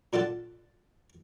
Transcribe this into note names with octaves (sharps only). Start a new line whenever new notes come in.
A#2 D4 F4 A4 F#5 A5